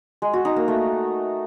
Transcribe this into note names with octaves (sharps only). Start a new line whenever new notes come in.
G#3
F#4
D#4
A#3
A3